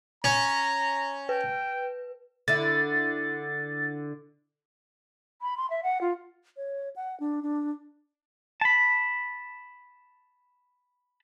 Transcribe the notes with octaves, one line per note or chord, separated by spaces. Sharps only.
C#4 A#5
B4 G5
D3 E4 A6
B5
C6
E5
F#5
F4
C#5
F#5
D4
D4
A5 B5